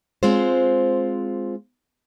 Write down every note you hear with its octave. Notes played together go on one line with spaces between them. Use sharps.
G#3 C4 F4 C5